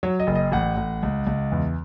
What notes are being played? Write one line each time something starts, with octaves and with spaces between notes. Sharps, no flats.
F#3 C#5
D#5
F#1
D#5
A1 F#5
A1
C#2
C#2
E2